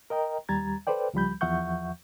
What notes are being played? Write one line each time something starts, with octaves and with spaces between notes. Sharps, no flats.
A#4 D#5 G5 A#5
D#2 G3 A#5 G#6 A6
A4 B4 C5 D5 G5
C#2 F3 G3 B5 G6
E2 F3 E5 F#5 C#6 G6